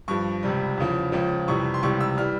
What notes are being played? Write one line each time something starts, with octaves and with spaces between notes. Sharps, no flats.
G2 F3 C#6
C#2 C3 G3
E2 C#3 F3
C#2 C#3 F3
F2 C3 E3 G3 C#6
C6
C#2 C3 E3 G3 C#6
E6
E3 G3 F6